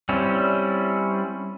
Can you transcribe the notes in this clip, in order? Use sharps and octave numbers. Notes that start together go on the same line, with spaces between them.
G3 C4 C#4 E4